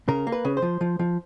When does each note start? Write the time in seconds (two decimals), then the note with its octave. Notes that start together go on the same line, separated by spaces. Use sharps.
0.08 C#3 A#4
0.27 A#3
0.32 B4
0.45 C#3
0.57 C5
0.62 F3
0.81 F3
0.99 F3